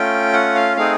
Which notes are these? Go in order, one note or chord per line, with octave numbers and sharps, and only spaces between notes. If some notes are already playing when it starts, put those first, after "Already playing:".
Already playing: A3 C#4 F4 G5
F#5
F5
A3 C4 D#4 G#4 F5